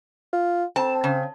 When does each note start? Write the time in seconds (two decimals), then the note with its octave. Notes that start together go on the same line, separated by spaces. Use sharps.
0.33 F4
0.76 C4 A5
1.04 C#3